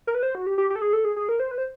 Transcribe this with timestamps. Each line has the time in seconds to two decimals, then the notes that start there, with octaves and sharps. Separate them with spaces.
0.07 A#4
0.15 B4
0.23 C5
0.35 F#4
0.47 G4
0.58 G4
0.70 G4
0.76 A4
0.82 G#4
0.93 A4
1.05 G#4
1.16 G#4
1.29 A#4
1.40 C5
1.51 B4
1.58 C5